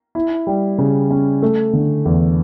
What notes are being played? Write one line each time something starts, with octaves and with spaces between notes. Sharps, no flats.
E4
G3
C#3
C#4
A3
D3
E2